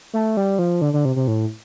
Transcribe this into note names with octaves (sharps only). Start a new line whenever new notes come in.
A3
G3
F3
D3
D3
C3
C3
A2